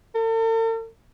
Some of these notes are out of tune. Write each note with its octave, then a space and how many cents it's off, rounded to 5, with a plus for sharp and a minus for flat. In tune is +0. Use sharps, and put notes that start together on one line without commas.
A4 +45